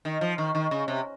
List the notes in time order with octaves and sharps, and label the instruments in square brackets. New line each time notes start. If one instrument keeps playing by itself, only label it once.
[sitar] D#3
F3
D#3
D#3
C#3
C3